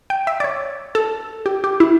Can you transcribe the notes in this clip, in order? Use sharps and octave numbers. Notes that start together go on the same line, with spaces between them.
G5
E5
D5
C#5
A4
G4
G4
E4